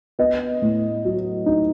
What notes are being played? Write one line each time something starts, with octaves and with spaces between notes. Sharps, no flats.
B3 D#5
A2
F#3
D#4